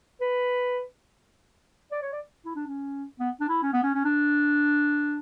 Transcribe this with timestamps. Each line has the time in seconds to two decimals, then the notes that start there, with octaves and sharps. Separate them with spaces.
0.21 B4
1.92 D5
2.02 C#5
2.13 D5
2.45 E4
2.56 D4
2.66 C#4
3.20 B3
3.40 D4
3.49 E4
3.62 C#4
3.73 B3
3.83 C#4
3.95 C#4
4.05 D4